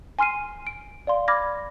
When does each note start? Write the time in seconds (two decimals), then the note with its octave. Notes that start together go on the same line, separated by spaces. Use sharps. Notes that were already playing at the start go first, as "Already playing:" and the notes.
0.19 G#5 C6 F6 C7 D#7
0.67 D7
1.07 D5 F5 C6
1.28 B5 D6 F6 G#6 A#6